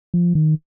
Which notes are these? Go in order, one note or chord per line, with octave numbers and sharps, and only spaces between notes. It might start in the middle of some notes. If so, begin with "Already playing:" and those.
F3
D#3